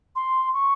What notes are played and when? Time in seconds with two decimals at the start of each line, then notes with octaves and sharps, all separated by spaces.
0.16 C6
0.54 C#6